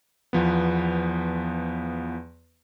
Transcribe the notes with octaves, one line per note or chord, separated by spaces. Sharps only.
E2 F3 B3